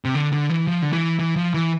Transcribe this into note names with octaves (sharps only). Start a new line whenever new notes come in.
C3
D3
D3
E3
F3
D3
E3
E3
F3
E3